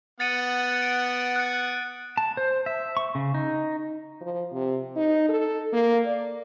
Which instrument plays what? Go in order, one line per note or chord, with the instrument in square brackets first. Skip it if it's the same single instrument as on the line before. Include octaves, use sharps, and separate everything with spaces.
[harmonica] B3 F#5 [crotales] A6 C#7 D#7
[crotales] D7
F#6 C#7
[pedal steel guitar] A5
C5
E5
C#6
C#3
D#4
[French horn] F3
C3
D#4
A4
A#3
D5